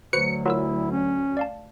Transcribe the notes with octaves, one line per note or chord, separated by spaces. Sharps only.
D2 F#3 F#4 B4 C5 C#7
F#3 E4 F4 A#4 E6
C#4
D5 F5 A5